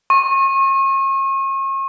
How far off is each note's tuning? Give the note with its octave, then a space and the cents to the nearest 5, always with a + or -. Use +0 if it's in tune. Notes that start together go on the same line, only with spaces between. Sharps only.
C#6 -40